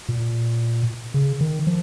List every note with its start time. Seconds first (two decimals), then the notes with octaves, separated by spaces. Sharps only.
0.09 A#2
1.14 C#3
1.41 D#3
1.67 F3